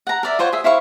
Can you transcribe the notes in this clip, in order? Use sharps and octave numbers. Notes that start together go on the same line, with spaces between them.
F#5 A#5
A#4 D5 E5
F4 C5 C#5 F#5
G#4 E5
E4 C5 F5 C#6